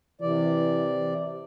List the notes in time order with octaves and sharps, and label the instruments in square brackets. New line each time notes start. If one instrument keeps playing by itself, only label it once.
[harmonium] C3 D5 [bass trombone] E3